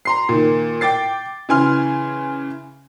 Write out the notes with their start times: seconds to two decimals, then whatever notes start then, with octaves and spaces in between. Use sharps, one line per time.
0.05 A#5 C6 C7
0.29 A#2 D#3
0.81 G5 D6 A6 C7
1.49 C#3 E3 G#5 C6 F6